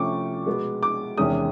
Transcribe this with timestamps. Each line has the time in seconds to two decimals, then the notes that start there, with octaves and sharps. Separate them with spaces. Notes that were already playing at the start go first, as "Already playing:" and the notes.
Already playing: C3 F3 A3 C#4 C#6 D6
0.46 B2 G#3 B3
0.83 D6
1.18 E2 C3 D#3 G#3 C#4 D#6